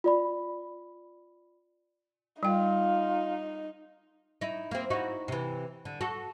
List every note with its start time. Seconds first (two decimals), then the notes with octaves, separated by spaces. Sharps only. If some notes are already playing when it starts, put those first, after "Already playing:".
0.04 F4 D5 B5
2.43 G3 D#4 F4 G5
4.41 D#4 E4
4.71 A#3 C4
4.90 D#4 E4 F#4
5.28 C3 E3
5.85 D3
6.01 F#4 A4